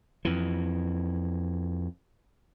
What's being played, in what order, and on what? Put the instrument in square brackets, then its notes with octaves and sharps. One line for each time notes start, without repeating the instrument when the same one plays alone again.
[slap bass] F2 E3